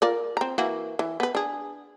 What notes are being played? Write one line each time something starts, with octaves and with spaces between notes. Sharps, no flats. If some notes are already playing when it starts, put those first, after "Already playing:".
F4 A#4 D5
C4 A#5
E3 A#3 F#4
E3
B3 B4
D4 G#4